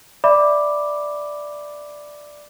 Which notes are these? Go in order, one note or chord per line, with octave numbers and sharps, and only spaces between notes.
D5 E5 B5 D6